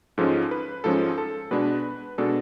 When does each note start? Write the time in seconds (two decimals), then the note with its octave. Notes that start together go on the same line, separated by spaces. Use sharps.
0.18 G#2 F3 G#3 C#4 A4
0.51 B4
0.84 G#2 F3 G#3 C#4 A4
1.18 A4
1.51 B2 G#3 D4 B4
2.18 B2 G#3 D4 A4